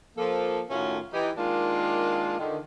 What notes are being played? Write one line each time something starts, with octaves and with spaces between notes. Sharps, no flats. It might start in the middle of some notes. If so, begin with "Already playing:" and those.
F3 A#3 A4
A2 D#3 A3 C#4 F4 F#4
E3 D#4 G4
D#3 G#3 A#3 D4 F4
D3 D#3